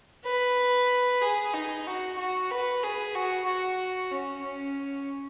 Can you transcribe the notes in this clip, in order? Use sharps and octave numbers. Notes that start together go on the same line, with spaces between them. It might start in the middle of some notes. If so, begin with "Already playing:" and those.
B4
G#4
D#4
F#4
F#4
B4
G#4
F#4
F#4
C#4
C#4